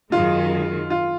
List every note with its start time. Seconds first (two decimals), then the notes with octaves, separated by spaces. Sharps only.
0.12 F#2 D#3 G#3 F4
0.90 F4